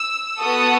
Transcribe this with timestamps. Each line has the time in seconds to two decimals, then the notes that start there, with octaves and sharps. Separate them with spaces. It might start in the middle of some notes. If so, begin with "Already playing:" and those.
Already playing: E6
0.40 B3 F#4 A4 D#6